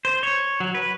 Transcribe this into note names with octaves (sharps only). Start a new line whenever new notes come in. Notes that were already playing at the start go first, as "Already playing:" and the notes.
C5
C#5
F#3
B4